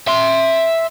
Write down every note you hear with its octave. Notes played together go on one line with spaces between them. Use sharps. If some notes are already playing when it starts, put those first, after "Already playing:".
E5 C6